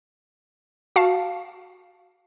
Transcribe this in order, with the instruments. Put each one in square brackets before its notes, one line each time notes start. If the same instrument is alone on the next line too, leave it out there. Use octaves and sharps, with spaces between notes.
[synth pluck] F#4 F5 A5